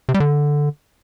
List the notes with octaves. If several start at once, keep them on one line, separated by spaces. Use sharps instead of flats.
C3
G3
D3